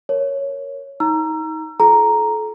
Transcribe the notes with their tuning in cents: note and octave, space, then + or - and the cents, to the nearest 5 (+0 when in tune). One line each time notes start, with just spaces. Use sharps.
A#4 +0 C#5 +0
D#4 +30 A#5 +0 E6 +35
F4 +5 A4 -35 A#5 +0